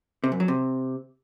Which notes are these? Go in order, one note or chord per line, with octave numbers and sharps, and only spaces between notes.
C3
F#2
F#3
C3